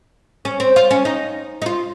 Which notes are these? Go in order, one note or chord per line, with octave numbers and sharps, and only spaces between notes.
C#4
C4
F4
C#4
D#4
D#4
F4